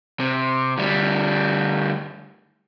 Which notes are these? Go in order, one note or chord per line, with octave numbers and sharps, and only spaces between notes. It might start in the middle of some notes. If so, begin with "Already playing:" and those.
C3
D2 G3